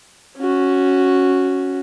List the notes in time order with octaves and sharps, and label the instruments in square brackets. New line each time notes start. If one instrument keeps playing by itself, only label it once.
[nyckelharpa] C#4 F#4